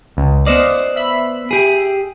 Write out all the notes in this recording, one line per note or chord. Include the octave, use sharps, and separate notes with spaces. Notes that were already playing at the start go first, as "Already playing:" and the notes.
C#2
B3 C5 D5 D#5 F5
E5 B5
G4 G#4